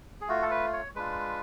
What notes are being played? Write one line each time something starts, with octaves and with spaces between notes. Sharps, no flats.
G#4
A3 F4 F#4
A4
B4
C#5
G#3 D4 F4 B4